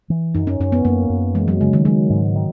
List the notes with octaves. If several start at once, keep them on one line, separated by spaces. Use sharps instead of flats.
E3
F#2 D#4
C#4
F#2 C#4
B3
F#2 A#3
F#2
E3 G#3
F#3
C#3 G#3
D#3
F#3 G#3
G#2
D#3